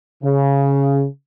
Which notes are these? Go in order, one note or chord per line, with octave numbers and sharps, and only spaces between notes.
C#3